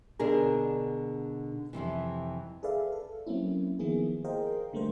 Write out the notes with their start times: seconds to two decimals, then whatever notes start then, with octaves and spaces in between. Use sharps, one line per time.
0.19 B2 D3 D4 G#4 A#4
1.73 F2 G#2 C3 E3
2.63 G#4 A4 B4 D5 E5 F5
2.92 A4
3.27 F#3 A#3 C4 C#4 E4
3.79 D#3 F3 A#3 B3 E4 G#4
4.24 G#4 A#4 C5 D#5 F5 G5
4.73 D3 G3 A3 A#3 A#4 C5